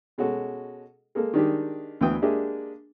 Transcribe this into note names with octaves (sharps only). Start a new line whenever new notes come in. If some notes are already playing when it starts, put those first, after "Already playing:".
B2 G#3 C#4 F#4 A4
G#3 A#3 A4
D#3 G#3 D4 D#4 G4
D2 E3 B3 E4 G5 D#6
G#3 A#3 D4 G4 G#4 E5